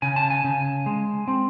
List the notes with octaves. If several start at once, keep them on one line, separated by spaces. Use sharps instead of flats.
C#3 G#5
A5
G#5
C#3
G#3
C4